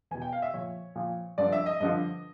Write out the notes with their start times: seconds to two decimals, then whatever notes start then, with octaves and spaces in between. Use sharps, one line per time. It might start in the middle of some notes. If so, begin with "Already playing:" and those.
0.11 E2 B2 G#5
0.22 G5
0.33 F5
0.42 E5
0.53 A#2 F3 C#5
0.95 A#2 F3
1.38 G2 D3 F3 D5
1.52 E5
1.66 D#5
1.80 G2 D3 F3 D#5